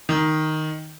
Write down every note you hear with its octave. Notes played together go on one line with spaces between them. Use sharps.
D#3